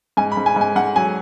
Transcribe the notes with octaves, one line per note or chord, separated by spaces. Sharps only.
G#2 G#5
B5
G#2
G#5
G#2 G#5
G#2 F#5
F#3 G#5